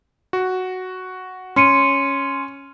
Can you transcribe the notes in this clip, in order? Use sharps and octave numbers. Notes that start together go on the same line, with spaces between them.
F#4
C#4 C6 C#7 D#7